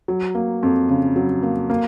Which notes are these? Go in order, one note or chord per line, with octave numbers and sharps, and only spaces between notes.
F#3
A#3
F2
C#3
F#3
A#3
A#3